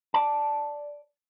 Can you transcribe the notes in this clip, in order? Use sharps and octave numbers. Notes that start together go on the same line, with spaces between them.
D5 A5